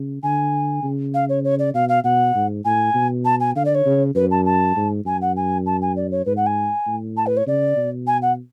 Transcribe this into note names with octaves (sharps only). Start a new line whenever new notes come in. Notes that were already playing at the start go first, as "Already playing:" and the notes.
Already playing: C#3
D3 G#5
C#3
F5
C#5
C#5
D5
B2 F5
F5
B2 F#5
G#2
A2 G#5
B2
A5
G#5
D3 F5
D5
C#5
C#3
F#2 B4
A5
A5
G#2
F#2 G#5
F#5
G#5
A5
G#5
D5
C#5
G#2 B4
F#5
G#5
A2
A5
B4
C#5
C#3 D5
B2
G#5
F#5